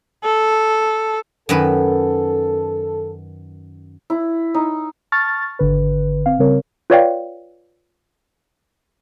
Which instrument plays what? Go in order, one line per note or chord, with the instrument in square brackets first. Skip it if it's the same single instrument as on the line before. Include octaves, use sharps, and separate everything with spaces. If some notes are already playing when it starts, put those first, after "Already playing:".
[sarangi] A4
[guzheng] F#2 D#3 B4 [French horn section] A4
[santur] E4
D#4
[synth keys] A5 C#6 F6 A6
G#1 D3 B4
C4 F5
C#3 G3 C4 A#4 C#5
[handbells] F4 B4 C#5 D5 F5 G5